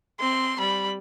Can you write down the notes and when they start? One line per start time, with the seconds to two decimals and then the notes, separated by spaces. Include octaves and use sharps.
0.20 C4 C6
0.60 G3 B5